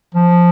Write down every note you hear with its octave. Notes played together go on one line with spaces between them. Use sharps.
F3